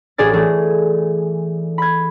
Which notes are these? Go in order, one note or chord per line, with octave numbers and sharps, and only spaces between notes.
A1 G#4 D5 A6
E3 A3 G#4
B5 G#6